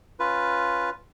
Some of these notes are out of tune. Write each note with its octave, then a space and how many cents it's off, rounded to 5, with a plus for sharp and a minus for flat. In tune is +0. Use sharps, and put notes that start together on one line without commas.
C#4 +0 F4 +0 B4 +0